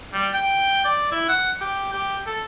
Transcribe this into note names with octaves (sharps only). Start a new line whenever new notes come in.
G3
G5
D5
E4
F#5
G4
G4
A4